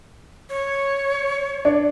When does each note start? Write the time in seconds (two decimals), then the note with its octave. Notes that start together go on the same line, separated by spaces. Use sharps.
0.50 C#5
1.65 D4